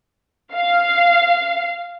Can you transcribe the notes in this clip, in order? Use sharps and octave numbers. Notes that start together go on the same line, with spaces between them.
F5